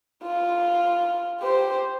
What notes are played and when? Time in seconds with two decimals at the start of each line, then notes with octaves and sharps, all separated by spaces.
0.24 F4
1.41 G4 C5